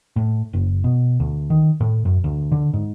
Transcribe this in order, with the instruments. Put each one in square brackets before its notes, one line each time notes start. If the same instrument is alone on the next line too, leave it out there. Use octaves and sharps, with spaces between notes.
[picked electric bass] A2
F#1
B2
D2
D#3
A2
F#2
D2
D3
G#2